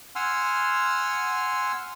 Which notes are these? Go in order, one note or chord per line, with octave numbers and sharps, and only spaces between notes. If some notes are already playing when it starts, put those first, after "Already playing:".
F#5 G#5 C6 E6 F6